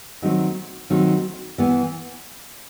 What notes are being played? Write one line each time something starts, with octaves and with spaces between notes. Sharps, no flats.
D#3 F#3 A3 C4 D#4
D#3 F#3 A3 C4 D#4
E3 B3